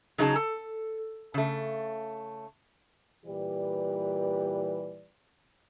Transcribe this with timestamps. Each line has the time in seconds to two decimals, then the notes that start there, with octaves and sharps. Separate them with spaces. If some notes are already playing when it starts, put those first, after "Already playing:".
0.18 C#3 F#3 D#4 G#4 B4 A5
0.36 A4
1.34 C#3 A3
3.25 A#2 E3 G3 G4 B4 D5